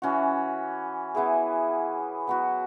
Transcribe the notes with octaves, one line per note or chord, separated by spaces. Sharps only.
E3 C#4 F#4
E3 B3 E4 G#4
F#3 B3 F#4